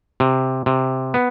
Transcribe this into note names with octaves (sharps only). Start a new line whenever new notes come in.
C3
C3
B3